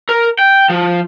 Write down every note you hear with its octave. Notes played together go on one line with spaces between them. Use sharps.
A#4
G5
F3